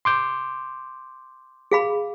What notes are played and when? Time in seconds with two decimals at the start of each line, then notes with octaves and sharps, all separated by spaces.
0.05 C6 D6 G6
1.72 G#4 F5 B5